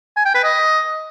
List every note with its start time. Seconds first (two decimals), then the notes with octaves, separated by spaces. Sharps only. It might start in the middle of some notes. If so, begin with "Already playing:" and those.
0.17 G#5
0.26 G5
0.35 B4
0.44 D#5